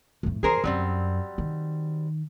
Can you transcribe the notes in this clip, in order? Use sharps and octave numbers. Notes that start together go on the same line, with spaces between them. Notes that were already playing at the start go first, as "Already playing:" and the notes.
F2 A2
E2 G#4 A#4 C5
F#2 F#3 G3 C4
D#3